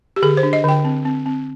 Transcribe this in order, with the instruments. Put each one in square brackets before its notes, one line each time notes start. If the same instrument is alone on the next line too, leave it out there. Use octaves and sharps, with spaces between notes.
[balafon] G4
D3 G#4
C5
D4
D#5
D3 G5
C4
C4
C4